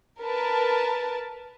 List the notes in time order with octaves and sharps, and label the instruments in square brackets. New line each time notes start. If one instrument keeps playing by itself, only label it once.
[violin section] A#4 B4 A5